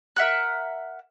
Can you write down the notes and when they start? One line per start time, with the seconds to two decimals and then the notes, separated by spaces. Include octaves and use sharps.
0.16 A#4 E5 F#5 F#6